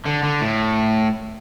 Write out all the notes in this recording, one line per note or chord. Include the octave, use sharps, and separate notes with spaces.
D3
D3
A2